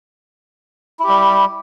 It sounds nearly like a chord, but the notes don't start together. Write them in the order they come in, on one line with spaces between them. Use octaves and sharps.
E4 G4 G3